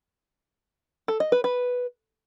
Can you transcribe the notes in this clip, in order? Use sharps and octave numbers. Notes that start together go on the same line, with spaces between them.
A4
D#5
B4
B4